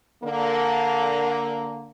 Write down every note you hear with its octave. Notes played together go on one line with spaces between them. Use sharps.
D3 A#3